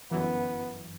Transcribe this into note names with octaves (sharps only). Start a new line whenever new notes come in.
G1 F#2 E3 B3